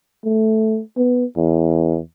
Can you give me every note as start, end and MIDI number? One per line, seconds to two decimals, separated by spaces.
0.25 0.81 57
0.97 1.25 59
1.37 1.99 40